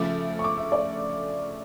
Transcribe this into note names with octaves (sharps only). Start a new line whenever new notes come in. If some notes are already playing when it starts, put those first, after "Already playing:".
Already playing: C#3 F3 A3 D6
C#6
D6
E5
D5